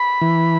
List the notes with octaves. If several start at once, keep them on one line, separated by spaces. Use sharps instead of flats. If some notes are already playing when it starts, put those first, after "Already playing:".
Already playing: B5
E3